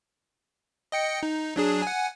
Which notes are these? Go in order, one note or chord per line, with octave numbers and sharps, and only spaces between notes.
D#5 G5 C#7
D#4
F#3 D4 G#4
F#5 G#5